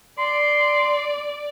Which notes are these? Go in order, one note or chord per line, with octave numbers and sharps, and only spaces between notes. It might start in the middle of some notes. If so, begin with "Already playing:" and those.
D5 C6